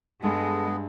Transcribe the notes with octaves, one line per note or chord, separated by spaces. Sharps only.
G2 G#3 B3 A4